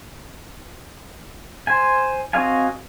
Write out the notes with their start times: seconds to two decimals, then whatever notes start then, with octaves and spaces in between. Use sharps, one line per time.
1.67 C5 G#5
2.33 C4 F#4 D#5 F5 G#5